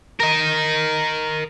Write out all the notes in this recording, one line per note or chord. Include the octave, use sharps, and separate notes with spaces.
A#4 D#5